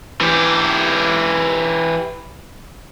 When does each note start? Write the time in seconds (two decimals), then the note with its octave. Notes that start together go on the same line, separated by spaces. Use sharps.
0.21 E3 G4